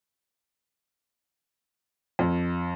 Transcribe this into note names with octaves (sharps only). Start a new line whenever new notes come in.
F2